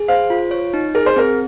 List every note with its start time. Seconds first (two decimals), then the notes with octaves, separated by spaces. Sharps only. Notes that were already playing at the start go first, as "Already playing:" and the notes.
Already playing: G#4
0.08 C5 F5
0.30 F4
0.51 C#5
0.74 D#4
0.95 G#4 A#4
1.06 C5
1.16 C4 A#4